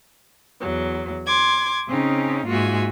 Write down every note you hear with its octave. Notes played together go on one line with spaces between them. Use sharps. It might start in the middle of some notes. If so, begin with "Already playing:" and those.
E2 F#3
C6 D6 G#6
C#3 C4 C#4 D#4
G#2 A#3 F4 F#4 E5 G#5